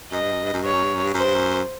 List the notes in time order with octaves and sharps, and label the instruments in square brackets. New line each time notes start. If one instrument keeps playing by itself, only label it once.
[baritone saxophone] F#2 [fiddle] D#5
[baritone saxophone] G2
F#2
G2
F#2
[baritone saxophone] G2 [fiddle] C#5
[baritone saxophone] F#2
G2
F#2
G2
[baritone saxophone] F#2 [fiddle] C5
[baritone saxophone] G2
F#2